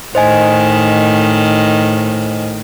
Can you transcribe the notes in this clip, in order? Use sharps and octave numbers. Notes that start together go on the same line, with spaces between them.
A2 D#3 C5 D#5 G#5